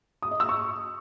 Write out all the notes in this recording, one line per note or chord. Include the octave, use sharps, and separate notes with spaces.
D#6
D#5
E6
C#6